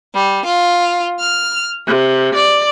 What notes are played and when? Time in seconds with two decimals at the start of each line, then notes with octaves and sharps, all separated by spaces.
0.15 G3
0.46 F4
1.20 F6
1.86 C3
2.34 D5